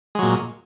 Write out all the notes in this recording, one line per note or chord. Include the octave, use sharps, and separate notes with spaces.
A#2 F#3 G#3